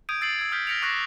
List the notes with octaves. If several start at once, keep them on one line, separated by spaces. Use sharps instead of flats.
D#6 G6 G#6 D7 D#7
E6 A6 C7 D7 F#7
E6 G#6
D#6 F6 G6 B6
F6 A#6 B6 C#7 D7 F7
C#6 D6 F#6 A#6 C7